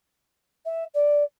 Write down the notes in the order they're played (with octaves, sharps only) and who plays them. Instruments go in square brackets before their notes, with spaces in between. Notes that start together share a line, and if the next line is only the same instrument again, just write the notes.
[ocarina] E5
D5